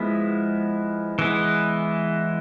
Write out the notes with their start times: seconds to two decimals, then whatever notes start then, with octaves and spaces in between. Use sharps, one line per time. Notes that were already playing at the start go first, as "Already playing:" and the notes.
Already playing: F3 G#3 B3 E4
1.19 E3 G#3 B3 E4